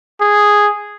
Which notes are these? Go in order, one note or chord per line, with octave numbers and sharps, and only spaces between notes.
G#4